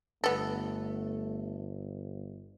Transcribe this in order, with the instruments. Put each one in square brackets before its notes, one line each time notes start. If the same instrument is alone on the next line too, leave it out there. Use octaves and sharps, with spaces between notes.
[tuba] G1 [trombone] A3 [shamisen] B3 A4